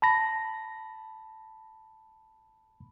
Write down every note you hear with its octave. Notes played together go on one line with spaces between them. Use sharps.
A5 B5 A#6